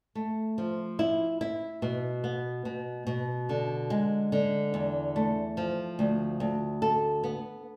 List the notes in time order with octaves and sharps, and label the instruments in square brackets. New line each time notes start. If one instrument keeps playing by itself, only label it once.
[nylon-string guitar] A3
F3
E4
E4
B2
B3
B2
B2
D3
G#3
D3
E2
A3
F3
D2
D2
A4
B3